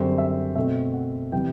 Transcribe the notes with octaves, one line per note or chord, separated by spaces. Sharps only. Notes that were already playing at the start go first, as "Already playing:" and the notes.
Already playing: F#2 D3 G3 C4 C5
E5
B2 A3 C4 E5
F#5
C3 E3 G3 G5